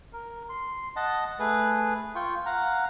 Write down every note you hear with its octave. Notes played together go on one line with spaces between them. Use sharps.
A#4
C6
D#5 F#5 A5
A3 G#4 B4
F4 G5 C#6
F5 F#5 A#5